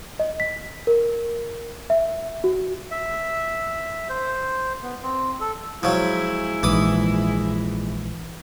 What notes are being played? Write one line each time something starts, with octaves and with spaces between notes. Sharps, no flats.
D#5
B6
A#4
E5
F#4
E5
C5
B3
C4
A4
F3 F#3 G#3 E4
A#1 G#2 E3 D6 D#6